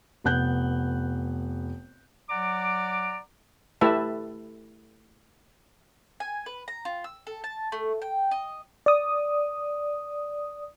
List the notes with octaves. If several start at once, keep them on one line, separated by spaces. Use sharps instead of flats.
F1 B3 F#6 G6
F#3 D5 F#5 A#5 D6
A3 E4 G4 B4 E5 A5
G#5
B4
A#5
F4
E6
A4
A5
A3
G5
D#5
D5 D#6